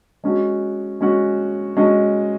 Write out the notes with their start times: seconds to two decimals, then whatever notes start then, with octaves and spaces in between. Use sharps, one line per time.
0.24 G#3 C#4 F#4
1.01 G#3 C#4 F#4
1.77 G#3 C#4 F#4